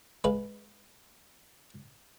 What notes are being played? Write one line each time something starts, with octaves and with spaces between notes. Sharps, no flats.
G#3 B4 F5